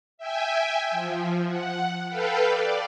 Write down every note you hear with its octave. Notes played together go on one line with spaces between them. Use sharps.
E5 G5 G#5
F3
F#5
A4 B4 F5 G5
D5